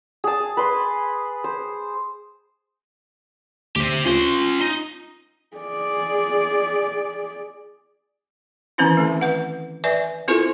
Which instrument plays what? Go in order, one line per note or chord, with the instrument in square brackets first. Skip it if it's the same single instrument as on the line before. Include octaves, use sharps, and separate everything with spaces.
[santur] G#4 A5
B4 C6
C5
[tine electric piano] D2 [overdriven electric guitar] G4 C5
[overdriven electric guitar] C#4 C6 [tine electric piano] F4
[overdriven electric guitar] D#4
[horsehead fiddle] G#4 D5
[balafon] D#3 E3 C4 C#4 E4
D3 A3
B4 F#5
B4 D5 E5 G#5
C4 E4 F4 A4 A#4 C5